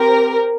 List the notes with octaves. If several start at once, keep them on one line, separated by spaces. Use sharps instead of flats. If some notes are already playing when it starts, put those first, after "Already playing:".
Already playing: C4 G4 A#4